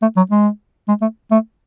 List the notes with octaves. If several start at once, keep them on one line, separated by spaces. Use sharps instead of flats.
A3
F#3
G#3
G#3
A3
A3